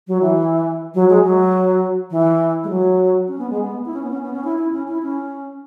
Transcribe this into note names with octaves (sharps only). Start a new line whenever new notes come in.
F#3
E3
F#3
G#3
F#3
E3
G#3
F#3
C#4
B3
G#3
B3
E4
C#4
B3
C#4
B3
C#4
E4
E4
C#4
E4
C#4